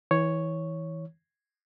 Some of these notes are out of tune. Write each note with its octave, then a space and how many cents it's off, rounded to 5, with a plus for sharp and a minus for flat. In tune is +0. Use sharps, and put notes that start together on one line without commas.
E3 -25 C#5 +0